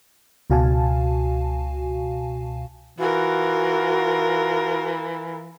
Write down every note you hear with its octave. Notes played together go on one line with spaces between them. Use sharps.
C#2 B2 F#4 F5 G#5 A5
E3 F4 F#4 A#4